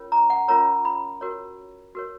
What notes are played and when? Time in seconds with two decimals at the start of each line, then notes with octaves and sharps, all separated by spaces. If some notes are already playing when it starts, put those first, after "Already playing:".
Already playing: C#4 F4 A#4 C#5
0.12 A#5
0.30 F#5
0.48 C#4 F4 A#4 C#5 A#5
0.85 B5
1.21 F#4 A#4 C#5
1.95 F#4 A#4 C#5